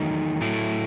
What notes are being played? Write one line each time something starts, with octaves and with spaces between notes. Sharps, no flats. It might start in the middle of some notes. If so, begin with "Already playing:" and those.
Already playing: E2 D#3 F#3 A3 D#4
A2 F#3 A3 E4